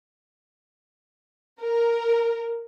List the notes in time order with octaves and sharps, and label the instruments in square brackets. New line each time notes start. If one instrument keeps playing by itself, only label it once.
[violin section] A#4